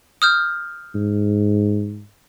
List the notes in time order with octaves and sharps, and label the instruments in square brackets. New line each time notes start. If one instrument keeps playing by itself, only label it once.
[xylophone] D#6 F6 G6
[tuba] G#2